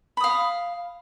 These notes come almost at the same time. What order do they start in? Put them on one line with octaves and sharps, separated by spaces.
B5 D#6 F5